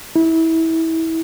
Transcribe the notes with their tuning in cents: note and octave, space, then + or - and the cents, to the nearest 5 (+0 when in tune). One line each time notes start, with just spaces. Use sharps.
E4 -25